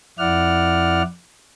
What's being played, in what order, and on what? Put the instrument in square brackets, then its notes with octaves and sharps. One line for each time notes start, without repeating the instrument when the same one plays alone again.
[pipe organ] F2 E4 D5 F#5 F6